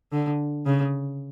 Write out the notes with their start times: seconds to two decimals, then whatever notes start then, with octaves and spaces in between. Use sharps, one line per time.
0.12 D3
0.66 C#3